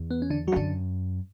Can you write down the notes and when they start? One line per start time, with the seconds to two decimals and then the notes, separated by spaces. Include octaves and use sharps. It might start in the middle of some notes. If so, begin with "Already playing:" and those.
Already playing: E2
0.11 B3
0.22 C#4
0.30 D3 D4
0.47 F#3 F#4
0.52 G2
0.56 F#2 D3 D4